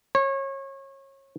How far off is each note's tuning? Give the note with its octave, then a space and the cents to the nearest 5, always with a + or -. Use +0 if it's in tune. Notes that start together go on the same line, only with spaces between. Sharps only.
C#5 -30